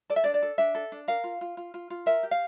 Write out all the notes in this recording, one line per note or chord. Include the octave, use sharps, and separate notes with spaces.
A4 D5
E5
D4 D5
D5
A4
D4 E5
A4
D4
A#4 F5
F4
F4
F4
F4
F4
A#4 E5
G4
F5